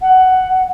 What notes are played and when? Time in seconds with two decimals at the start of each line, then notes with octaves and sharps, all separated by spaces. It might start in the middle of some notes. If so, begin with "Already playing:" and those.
0.01 F#5